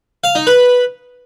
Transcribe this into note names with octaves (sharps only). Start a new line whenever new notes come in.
F5
D#4
B4